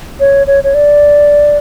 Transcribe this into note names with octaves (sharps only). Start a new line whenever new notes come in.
C#5
C#5
C#5
D5